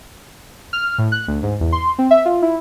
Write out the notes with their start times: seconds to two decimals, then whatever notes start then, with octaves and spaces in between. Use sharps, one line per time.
0.73 F6
0.98 A2
1.12 F#6
1.28 D2
1.43 G#2
1.60 E2
1.72 C6
1.99 C4
2.11 E5
2.25 F4
2.42 E4